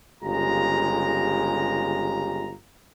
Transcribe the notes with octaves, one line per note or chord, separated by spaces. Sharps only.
G1 C#3 G#3 F4 G4 A#5